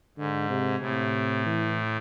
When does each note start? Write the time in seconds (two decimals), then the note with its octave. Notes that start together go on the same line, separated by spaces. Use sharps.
0.17 G#2 D3
0.49 C3
0.81 A2 C3
1.46 E3